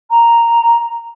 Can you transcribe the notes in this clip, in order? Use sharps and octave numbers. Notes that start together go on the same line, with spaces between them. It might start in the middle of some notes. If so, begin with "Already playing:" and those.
A#5